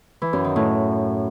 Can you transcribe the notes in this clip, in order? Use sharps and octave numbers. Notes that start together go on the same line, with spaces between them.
E3
F#2
D#3
A2